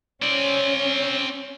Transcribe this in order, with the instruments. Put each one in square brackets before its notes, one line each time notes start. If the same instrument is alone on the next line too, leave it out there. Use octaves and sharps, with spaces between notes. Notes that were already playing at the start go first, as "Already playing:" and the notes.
[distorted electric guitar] C4 D5 [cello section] C#4